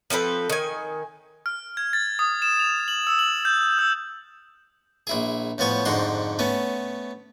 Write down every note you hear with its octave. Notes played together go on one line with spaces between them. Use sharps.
F3 C4 A4 B4
D#3 G#5
F6
G#6
A6
D#6
E7
F7
F#7
E6
F#7
G6
E6
A#1 E4 G#4
A2 F3 B3 C#5 C#6
F2 G#2 D3 F#4 C6
A3 B3 C#4